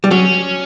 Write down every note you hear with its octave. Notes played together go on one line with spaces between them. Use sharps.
G3
F#3 C#4